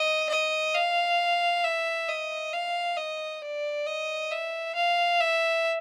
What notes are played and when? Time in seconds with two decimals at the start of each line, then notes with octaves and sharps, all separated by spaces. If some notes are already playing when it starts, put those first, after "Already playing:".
Already playing: D#5
0.30 D#5
0.75 F5
1.64 E5
2.09 D#5
2.53 F5
2.97 D#5
3.42 D5
3.86 D#5
4.31 E5
4.75 F5
5.20 E5